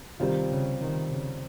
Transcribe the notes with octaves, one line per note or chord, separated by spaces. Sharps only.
C3 D#3 G3 C4 F4
C#3
D#3
C#3